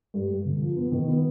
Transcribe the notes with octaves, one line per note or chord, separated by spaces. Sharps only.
G2
G2
D3
F3
B3
D#3
B3